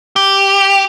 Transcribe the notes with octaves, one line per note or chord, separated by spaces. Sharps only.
G4